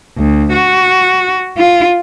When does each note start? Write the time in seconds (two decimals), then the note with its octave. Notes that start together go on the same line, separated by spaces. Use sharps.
0.17 D2
0.53 F#4
1.57 F4